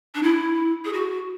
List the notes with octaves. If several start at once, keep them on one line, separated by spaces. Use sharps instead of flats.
D4
E4
G#4
F#4